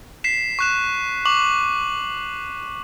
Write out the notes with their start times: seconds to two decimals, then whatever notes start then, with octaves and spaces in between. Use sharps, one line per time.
0.24 B6 C7 E7
0.59 C#6 F#6 E7
1.25 C#6 D6 F#7